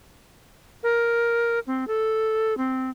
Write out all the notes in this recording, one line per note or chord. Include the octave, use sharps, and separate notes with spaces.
A#4
C4
A4
C4